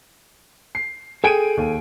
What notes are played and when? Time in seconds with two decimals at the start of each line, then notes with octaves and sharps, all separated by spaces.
0.75 C7
1.24 G#4 A4 G5 G#5 D7 D#7
1.57 D#2